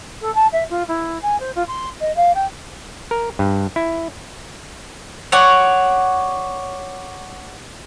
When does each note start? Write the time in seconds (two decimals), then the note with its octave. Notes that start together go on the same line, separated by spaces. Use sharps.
0.21 A4
0.34 A5
0.52 E5
0.69 F4
0.88 E4
1.22 G#5
1.40 C5
1.55 F4
1.68 C6
2.00 D#5
2.16 F5
2.34 G5
3.11 A#4
3.39 G2
3.76 E4
5.32 C#5 D5 F#5